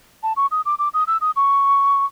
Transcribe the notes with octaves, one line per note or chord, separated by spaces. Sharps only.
A5
C#6
D#6
D6
D6
D#6
E6
D#6
C#6